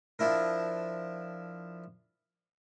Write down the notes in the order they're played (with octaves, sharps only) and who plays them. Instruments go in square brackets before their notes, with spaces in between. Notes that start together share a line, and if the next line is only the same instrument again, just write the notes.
[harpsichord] F3 D4 E4 A#4